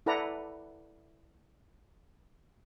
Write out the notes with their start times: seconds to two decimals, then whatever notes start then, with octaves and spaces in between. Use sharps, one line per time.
0.06 E4 A4 B4 D5 F#5 A#5